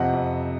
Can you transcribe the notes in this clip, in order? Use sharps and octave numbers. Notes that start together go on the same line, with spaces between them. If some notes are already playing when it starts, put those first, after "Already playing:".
Already playing: F2 C3 F3 C4 D#5 F#5
F2